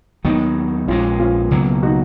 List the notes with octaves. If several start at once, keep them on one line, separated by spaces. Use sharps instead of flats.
D#2 D#3 F#3 B3 D#4
A#1 A#2 G#3 C#4 F4
C#4 F4
C#2 B2 F#3 A#3
D#4 F#4